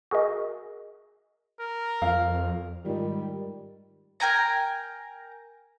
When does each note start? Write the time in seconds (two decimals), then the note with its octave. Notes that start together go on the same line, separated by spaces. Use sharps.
0.11 F#4 G#4 A#4 D#5
1.59 A#4
2.02 F2 F5
2.85 G#2 D#3 G3 G#3 F4
4.20 A#4 G5 G#5 A#5